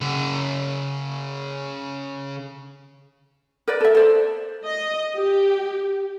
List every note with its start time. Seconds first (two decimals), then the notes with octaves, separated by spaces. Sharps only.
0.01 C#3 F#5
3.68 A#4 B4 D5
3.81 A4 E5
3.95 A4 C5 D5
4.63 D#5
5.16 G4